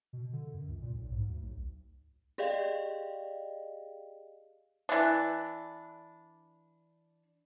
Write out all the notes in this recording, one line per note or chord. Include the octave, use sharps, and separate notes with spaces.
B2
D3
F#2
C#2
A#2
B1
G#2
D2
B1
G4 G#4 D5 D#5 F5 G5
E3 D4